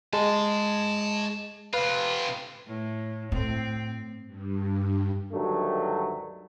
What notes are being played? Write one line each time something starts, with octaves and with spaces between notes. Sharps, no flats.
G#3 C#5 A5
C3 F4 B4
A2
A2 C4
G2
D2 G2 D#3 F#3 A3